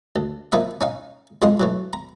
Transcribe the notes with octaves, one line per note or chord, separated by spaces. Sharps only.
D2
F3 A#3 D#4 D#5 E5
C#4 D#4 F5
F2 G#3 F4 D#5 C6
A2 E3 F#3
A#5